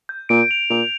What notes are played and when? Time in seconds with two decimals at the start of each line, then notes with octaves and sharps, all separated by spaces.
0.09 G6
0.29 A#2 D7
0.51 F7
0.70 A#2 F7